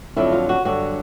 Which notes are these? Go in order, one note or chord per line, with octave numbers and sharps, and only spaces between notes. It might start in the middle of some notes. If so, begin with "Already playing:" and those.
F2 D3 F#3 E4
F4
F#4
G2 D3 F#3 F#4